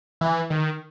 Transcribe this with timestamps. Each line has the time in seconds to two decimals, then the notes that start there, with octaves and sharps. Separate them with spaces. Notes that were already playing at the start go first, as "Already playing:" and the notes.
0.21 E3
0.50 D#3